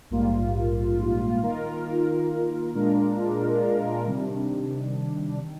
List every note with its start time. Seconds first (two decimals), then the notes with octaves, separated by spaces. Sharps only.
0.10 A#1 G#2 G3 A#3 F4
1.42 D#3 A#3 F4 A#4
2.74 A#2 G#3 D4 F4 A#4
4.07 C3 D#3 G3 D4
5.42 D#3